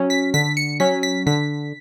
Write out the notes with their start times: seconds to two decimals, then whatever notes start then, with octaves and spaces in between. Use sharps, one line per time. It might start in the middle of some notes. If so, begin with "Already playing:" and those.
Already playing: F#3 C#4
0.10 B6
0.34 D3 B6
0.57 C#7
0.80 F#3 C#4 B6
1.03 B6
1.26 D3 B6